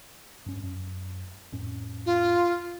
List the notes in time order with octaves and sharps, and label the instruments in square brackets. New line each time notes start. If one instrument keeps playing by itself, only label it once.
[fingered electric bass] G2 C#4
F#2
F2 A2 C#4
[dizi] F4